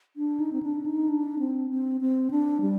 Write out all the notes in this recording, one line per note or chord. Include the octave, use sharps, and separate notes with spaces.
D4
D#4
C4
D4
D#4
D4
C4
C4
C4
D4
G3